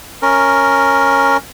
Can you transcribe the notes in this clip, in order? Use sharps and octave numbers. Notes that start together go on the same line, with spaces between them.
C#4 A#4